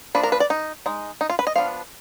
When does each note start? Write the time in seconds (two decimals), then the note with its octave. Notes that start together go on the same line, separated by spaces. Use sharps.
0.15 F3 A#3 D4 B4
0.23 A#4
0.32 B4
0.40 D5
0.50 D#4
0.86 G#3 D#4
1.21 D#4
1.30 F4
1.39 B4
1.47 D#5
1.56 F3 B3 D4 F5